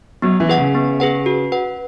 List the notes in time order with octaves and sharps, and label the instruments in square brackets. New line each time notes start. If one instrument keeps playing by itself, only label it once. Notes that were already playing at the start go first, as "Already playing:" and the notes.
[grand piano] F#3 [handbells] B3
[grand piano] E3
[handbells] G#4 B4 F#5
[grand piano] C#3
[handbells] B3
G#4 B4 F#5
F#4
B4 F#5